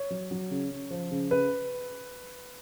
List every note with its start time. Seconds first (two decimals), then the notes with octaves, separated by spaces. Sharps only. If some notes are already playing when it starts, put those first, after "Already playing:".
Already playing: C#5
0.10 F#3
0.31 F#3
0.51 C#3
0.70 C#3
0.91 F3
1.11 C#3
1.31 C#3 B4